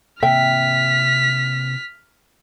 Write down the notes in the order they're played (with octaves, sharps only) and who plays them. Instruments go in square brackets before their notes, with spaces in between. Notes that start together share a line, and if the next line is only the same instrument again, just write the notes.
[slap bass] C3 A#3 C4 [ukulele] E5 G5 [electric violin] F6 B6